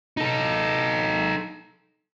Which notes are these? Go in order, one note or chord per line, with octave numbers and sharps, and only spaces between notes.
D#4 A4